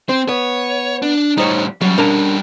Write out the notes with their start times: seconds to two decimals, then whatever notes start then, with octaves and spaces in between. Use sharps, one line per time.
0.09 C4 C5
0.29 B3 C#5
1.02 D4
1.38 A2 G3 D#4 C5 C#5
1.82 F#3 G3 C#4
1.98 D4 A#4 A5